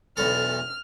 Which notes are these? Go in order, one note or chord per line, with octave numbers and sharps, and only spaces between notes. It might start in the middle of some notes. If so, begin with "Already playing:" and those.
B1 E2 A4 F6